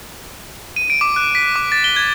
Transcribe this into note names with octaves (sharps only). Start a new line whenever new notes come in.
D#7
D7
D6
F#6
B6
D6
A6
G7
G#6